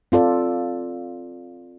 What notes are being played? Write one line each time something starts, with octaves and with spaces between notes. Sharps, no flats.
C4 F4 A4 D5